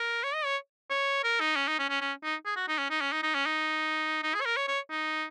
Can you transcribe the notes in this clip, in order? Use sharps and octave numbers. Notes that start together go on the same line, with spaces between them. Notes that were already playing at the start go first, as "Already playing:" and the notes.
Already playing: A#4
C#5
D#5
C#5
C#5
A#4
D#4
C#4
D#4
C#4
C#4
C#4
D#4
G#4
F#4
D#4
C#4
D#4
C#4
D#4
D#4
C#4
D#4
D#4
G#4
C#5
A#4
C#5
C#5
D#4